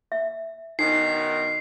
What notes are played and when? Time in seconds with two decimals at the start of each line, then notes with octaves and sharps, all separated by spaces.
0.12 E5
0.79 F#2 B2 D#3 D4 D#4 C7